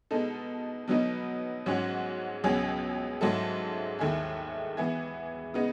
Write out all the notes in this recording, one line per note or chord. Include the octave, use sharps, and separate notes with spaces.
B2 G#3 D#4 A4
B2 F#3 B3 D#4
G#2 F#3 C#4 F#4
C#2 B2 F#3 C#4 G#4
G#2 F#3 A3 E4 A4
D#2 D#3 A3 E4 G#4
E3 B3 E4 G#4
C#3 G#3 B3 D#4